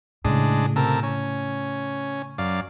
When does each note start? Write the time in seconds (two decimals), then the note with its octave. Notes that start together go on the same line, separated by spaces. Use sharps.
0.25 A2 C#3 G#3 D4
0.76 C3 A4 A#4
1.03 C#4
2.38 F#2 D5 F5